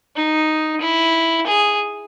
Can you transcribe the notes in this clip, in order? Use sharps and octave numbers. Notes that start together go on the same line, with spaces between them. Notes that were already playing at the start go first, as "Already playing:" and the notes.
D#4
E4
G#4